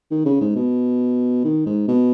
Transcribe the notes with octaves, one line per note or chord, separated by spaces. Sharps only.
D#3
C#3
G#2
B2
D#3
G#2
B2